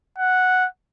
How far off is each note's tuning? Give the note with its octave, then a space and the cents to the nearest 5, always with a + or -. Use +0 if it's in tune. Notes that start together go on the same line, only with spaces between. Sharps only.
F#5 -5